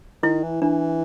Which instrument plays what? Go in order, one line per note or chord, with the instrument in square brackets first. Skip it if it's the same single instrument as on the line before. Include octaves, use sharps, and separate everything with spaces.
[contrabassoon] D#3 [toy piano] E4
[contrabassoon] E3
[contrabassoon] E3 [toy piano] D4